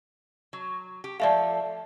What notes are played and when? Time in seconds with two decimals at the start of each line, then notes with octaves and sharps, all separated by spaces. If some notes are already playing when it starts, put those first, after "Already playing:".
0.53 F#3
1.04 G4
1.20 F3 A3 A4 D5 E5 F5